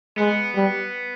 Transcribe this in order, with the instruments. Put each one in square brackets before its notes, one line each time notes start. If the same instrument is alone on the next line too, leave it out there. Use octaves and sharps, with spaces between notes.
[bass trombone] G#3 [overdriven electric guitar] B3
[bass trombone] G3